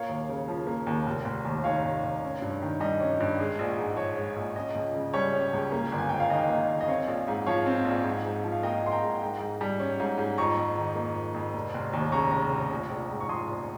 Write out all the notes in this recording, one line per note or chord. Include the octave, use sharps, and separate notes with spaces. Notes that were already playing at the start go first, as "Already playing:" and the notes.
Already playing: A#2 A#3 C#5 F5
D#2
C#3
F3
A#3
D#2
F1
F1
D#2
D#3 C#5 F5
F1
F1
C#4
G2
D#3
G3 D#5
C#4
G2
G#3
A#1
G#2
F3 C#5
G#3
A#1
C#4 D#5
C#2
C#3
G3 C#5
C#4
C#2
A#3
G1
G#5
F2 G5
F5
D#3 D#5
A#3
G1
D#5
C4 C#5 F5
A#1
G#2
F3 C#5 F5
C4
A#1
G#2
G#2
F3
F5
A#3 D#5 G5
G#2 C6
G5 A#5
G#2
G#2
G#2
G3
C#4
G#2
G#2
F2 A#5 C#6
F2
D#3
A#3
F2
F2
F1
F1
D#2
C#3 A#5 C#6
F1
F1
A#1
A#1
G#2
C#6
F3 C6 D#6
A#1